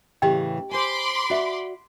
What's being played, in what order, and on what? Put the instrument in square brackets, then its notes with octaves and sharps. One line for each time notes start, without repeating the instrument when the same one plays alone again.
[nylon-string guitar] A2 C#3 E3 [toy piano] G4 D#5 G5
[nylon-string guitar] C5 G#5 [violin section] B5 C6 D6
[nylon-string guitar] F#4 D5 E5